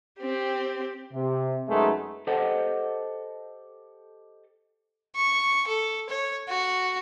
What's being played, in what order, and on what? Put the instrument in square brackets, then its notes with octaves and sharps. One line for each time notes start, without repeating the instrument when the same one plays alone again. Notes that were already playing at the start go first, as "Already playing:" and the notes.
[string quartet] C4 G4
[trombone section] C3
F#2 G#3 A3 B3 D#4
[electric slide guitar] G4 A4 C5 D#5 F#5 A5
[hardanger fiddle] C#6
A4
C#5
F#4